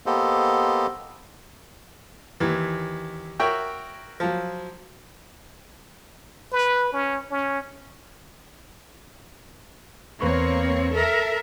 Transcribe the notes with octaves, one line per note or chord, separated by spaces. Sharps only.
A#3 B3 G4 A4 C5 D#5
D#2 E3
F#4 A#4 C#5 E5 G5
F3 F#3
B4
C#4
C#4
E2 A#3 C4 B4 C#5 C#6
A4 A#4 E5